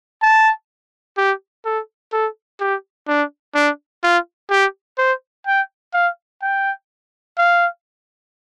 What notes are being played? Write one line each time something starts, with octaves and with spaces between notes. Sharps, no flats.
A5
G4
A4
A4
G4
D4
D4
F4
G4
C5
G5
F5
G5
F5